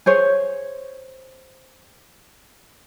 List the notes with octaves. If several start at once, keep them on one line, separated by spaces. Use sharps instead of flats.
G#4 C5 C#5